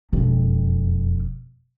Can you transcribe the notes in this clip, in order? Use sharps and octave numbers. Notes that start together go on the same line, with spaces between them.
E1 F2